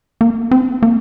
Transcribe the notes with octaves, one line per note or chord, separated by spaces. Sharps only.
A#3
C4
A#3